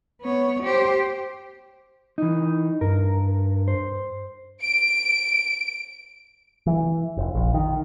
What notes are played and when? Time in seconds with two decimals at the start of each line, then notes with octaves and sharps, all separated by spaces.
0.22 B3 C#5
0.63 G4 C5
2.18 E3 D#4
2.81 G2 A#4
3.68 C5
4.63 D7
6.66 E3
7.17 F1
7.35 A#1
7.54 D#3